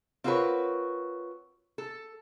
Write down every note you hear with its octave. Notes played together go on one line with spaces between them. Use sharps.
C4 F4 F#4 A#4 B4 C#5
A4